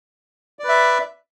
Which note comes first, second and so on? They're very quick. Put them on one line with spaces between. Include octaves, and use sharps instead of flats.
D5 B4 E5